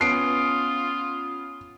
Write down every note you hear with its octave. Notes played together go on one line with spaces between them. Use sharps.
B3 C#4 F4 D#6 C7 D7